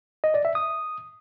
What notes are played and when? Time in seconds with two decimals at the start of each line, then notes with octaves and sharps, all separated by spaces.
0.24 D#5
0.34 D5
0.45 E5
0.55 D#6